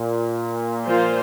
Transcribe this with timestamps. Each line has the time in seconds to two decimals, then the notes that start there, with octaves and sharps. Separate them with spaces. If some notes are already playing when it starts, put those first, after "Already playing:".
Already playing: A#2
0.85 F3 A#3 F4 C5